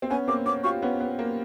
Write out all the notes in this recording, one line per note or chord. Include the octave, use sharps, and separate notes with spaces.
C4
B3 C#4 G#5
A#3 C4 D6
B3 C#4 D6
F4 G4 C#6
B3 C#4
B3
A#3